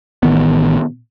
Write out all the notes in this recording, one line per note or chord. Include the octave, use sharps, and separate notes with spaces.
A1 D#3 B3